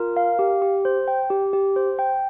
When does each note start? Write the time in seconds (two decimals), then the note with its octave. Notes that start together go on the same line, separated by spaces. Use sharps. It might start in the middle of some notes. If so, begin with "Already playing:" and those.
Already playing: F4 A#4
0.17 F5
0.39 G4
0.62 G4
0.85 C5
1.08 G5
1.30 G4
1.53 G4
1.76 C5
1.99 G5